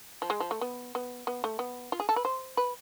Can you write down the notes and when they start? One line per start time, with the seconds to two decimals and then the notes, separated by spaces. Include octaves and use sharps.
0.22 F3
0.30 G#3
0.40 F3
0.51 A3
0.61 B3
0.95 B3
1.27 B3
1.44 A3
1.59 B3
1.92 F4
2.00 G#4
2.09 A4
2.16 B4
2.25 C5
2.57 B4